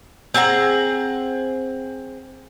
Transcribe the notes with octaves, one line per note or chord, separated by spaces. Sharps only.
C4 G#4 F#5 A#5